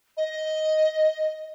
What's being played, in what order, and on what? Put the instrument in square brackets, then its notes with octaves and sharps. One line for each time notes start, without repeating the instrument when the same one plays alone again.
[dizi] D#5